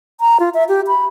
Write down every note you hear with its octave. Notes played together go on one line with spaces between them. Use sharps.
A#5
F4
E5
G4
B5